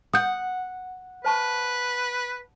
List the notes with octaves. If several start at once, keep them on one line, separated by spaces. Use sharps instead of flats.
F#5 D#6 G6
B4 C5 A5 C#6